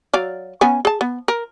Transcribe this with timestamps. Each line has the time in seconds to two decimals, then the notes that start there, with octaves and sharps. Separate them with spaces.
0.13 F#3 D5 F5
0.61 B3 C#4 G#5
0.85 G#4 A5
1.01 B3
1.28 A#4